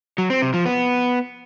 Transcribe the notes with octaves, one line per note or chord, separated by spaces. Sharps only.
F#3
C4
C3
F3
B3